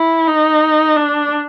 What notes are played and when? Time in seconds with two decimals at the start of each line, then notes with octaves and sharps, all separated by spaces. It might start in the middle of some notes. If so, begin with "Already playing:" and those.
Already playing: E4
0.27 D#4
0.96 D4